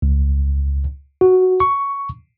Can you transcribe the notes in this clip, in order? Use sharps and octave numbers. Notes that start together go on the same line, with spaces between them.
C#2
F#4
C#6